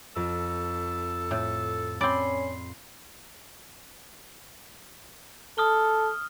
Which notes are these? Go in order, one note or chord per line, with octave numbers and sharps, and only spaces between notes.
F2 A4
A2
C4 C#4 D5 B5 C6
A4 D#6 F6 G7